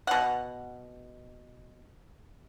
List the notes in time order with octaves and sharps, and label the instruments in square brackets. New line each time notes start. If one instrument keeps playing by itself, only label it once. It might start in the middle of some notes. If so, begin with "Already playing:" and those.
[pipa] B2 F#5